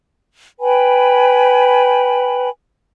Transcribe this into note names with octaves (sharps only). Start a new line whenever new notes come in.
B4 G5 G#5 B5